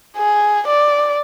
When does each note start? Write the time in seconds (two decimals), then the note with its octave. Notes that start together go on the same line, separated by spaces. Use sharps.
0.17 G#4
0.68 D5